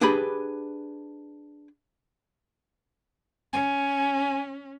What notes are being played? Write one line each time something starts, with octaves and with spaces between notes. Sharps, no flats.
D4 G4 G#4 B4 B5
C#4 G#5